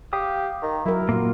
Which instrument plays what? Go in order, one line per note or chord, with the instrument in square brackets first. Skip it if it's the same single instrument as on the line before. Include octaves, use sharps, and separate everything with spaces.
[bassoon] G4 [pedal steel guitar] F5 D#6
[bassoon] D#3
[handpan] F#3 A#4 [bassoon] E4
[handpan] A#2 F#4 [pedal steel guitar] A#3 F4